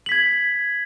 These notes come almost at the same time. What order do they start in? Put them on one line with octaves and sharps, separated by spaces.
F#7 B6 G#6